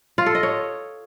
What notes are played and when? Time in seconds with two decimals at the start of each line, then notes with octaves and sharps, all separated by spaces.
0.18 F4
0.26 A4
0.35 D#5
0.43 C#5